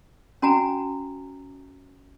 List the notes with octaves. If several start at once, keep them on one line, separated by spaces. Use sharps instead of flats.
C#4 F#4 G#5 A#5